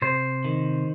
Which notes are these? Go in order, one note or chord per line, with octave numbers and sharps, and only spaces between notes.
C3 C5
D#3